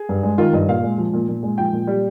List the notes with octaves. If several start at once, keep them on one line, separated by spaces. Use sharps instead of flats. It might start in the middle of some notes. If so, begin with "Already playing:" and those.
Already playing: G#4
G2
G#3
D#3 F4
G2 D#5
A#2 F5
G#3
F3
A#2
A#2
G#3
F3 G5
A#2
G3